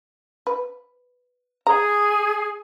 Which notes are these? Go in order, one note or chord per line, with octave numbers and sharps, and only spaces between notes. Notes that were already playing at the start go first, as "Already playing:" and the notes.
B4
G#4 A#5